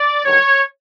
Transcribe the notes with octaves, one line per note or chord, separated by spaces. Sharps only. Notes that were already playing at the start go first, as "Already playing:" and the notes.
Already playing: D5
G2 D#3 F#3 C#5